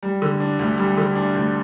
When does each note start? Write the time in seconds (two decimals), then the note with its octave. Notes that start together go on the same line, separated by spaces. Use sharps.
0.03 G3
0.22 D3
0.40 D4
0.59 D2
0.78 G3
0.97 D3
1.15 D4
1.34 D2